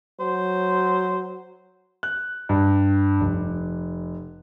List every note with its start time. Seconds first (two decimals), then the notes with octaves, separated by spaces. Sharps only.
0.20 F#3 C5
2.03 F#6
2.49 G2
3.20 F1